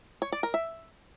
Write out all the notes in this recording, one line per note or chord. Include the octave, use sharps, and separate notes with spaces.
C#5
D5
A#4
E5